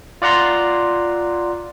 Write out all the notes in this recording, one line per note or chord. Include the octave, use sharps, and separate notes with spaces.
F4 D5 F#5 A#5 C6